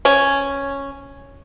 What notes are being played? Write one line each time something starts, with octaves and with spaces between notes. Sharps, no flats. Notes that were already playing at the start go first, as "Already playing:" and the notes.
C#4